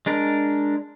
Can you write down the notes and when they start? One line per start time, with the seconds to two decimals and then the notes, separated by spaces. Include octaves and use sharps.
0.06 G#3 D4 A#4